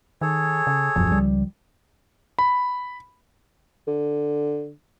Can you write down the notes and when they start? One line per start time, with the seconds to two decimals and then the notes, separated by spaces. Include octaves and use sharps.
0.21 D#3 G#4 A4 C#5
0.67 C#3
0.96 D#1 F#2 F3
1.11 C#2 G3
2.39 B5
3.87 D3